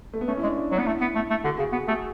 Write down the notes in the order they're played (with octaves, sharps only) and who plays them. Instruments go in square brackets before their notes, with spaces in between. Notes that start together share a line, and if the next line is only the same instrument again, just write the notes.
[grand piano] A3
B3
[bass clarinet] A3 [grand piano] C#4
[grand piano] E4
[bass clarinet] G#3 [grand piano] D4
[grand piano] D4
[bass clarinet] F#3 [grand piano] D4
[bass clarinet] B3
[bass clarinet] A3 [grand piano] E4
[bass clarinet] B3
A3
A3
[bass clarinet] D3 [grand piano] F#4
[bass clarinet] C#3 [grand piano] G#4
[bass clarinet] B3 [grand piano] F#4
[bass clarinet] A3 [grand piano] G#4